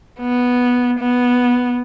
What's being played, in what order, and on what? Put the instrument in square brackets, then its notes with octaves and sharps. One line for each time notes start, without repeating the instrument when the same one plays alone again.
[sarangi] B3
B3